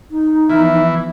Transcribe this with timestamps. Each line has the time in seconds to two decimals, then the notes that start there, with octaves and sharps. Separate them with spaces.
0.11 D#4
0.49 E3 F3 B3 E5 F6